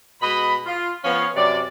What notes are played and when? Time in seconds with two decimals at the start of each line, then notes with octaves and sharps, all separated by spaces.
0.21 B2 G#3 D#5 B5
0.66 F4
1.04 F3 B3 C#4 C#5 F5
1.35 F#2 C3 F#3 D5